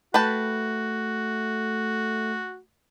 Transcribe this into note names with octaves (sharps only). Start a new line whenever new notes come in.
A3 F#4 B4 G5 A5